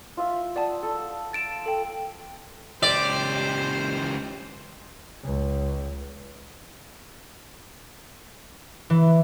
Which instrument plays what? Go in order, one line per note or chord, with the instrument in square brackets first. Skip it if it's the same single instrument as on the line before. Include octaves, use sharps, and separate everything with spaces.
[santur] F4 E5
[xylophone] D5 F#5 A5 [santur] D#6
[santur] A4
[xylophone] A6 D7 E7
A4 G5
[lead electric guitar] C#2 G4 [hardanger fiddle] C5 [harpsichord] D5
[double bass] C#2
[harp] E3